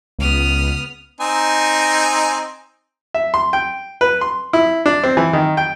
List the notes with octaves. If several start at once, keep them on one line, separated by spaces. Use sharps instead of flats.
C#2 B3 D#6 F6
C4 D#4 G#5
E5
C6
G5
B4
C6
E4
D4
C4
E3
D#3
G5